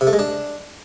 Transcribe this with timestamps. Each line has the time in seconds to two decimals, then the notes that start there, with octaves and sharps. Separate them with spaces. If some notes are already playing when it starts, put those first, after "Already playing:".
0.01 C3
0.07 A3
0.13 G#3
0.19 D4